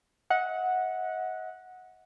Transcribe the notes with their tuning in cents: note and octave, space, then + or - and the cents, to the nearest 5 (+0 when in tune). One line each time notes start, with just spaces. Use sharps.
D#5 +40 F#5 -10